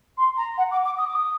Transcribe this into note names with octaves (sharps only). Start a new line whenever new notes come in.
C6
A#5
F#5
D6
D6
D#6
D6
D#6